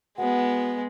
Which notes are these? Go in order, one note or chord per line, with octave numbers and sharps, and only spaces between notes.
G#3 B3 F#4 F#5